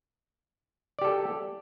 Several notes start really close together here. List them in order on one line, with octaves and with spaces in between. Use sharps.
D5 G4 A4